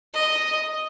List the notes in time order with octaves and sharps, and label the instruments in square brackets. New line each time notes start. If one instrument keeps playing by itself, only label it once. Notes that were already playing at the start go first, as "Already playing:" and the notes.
[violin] D#5